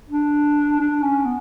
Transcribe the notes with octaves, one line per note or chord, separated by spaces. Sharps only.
D4
D4
C#4
B3